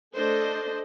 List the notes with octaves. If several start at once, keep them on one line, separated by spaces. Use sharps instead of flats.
A3 D4 A4 C5 D#5